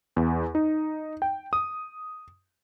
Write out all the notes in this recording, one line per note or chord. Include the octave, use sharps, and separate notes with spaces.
E2
D#4
G5
D#6